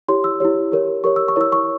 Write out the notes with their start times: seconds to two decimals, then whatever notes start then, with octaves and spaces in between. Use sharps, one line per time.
0.08 E4 G4 C#5 C6
0.24 E6
0.40 E4 G4 C#5
0.72 G4 A#4 C#5
1.04 G4 A#4 C#5 C#6
1.16 E6
1.28 C#6
1.36 E4 A#4 C#5 E6
1.52 C#6